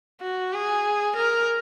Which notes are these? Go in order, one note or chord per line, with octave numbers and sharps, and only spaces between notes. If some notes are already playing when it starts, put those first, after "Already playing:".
F#4
G#4
A#4